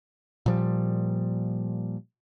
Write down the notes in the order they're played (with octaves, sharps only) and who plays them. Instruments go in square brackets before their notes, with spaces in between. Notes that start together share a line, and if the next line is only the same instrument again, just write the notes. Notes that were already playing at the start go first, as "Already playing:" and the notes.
[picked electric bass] A#2 F3 G3